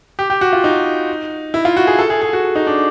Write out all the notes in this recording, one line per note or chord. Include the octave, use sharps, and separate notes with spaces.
G4
G4
F#4
F4
D#4
E4
F4
F#4
G#4
A4
G#4
G#4
F#4
D#4
D4